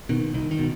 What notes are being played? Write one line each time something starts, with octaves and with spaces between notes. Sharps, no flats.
B2 D#3
C2 D#3
D#3
B2